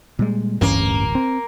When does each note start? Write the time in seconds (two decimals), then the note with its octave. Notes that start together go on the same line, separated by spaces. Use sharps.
0.19 A#2 G3 G#3
0.61 D1 A1 G2 E3 A#3 C#4
1.15 C4